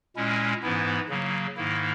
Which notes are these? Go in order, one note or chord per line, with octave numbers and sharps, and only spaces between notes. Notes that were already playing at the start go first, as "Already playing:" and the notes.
A#2 G#3 C#4 E4
G#2 E3 B3 E4
C#3 F#3 A#3
G#2 D#3 A#3 E4